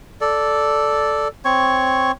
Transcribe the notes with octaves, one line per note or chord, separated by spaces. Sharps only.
A4 D5
C4 C#5 C#6